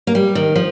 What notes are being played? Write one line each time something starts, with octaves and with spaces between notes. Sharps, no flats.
A#3
G3
D#3
F3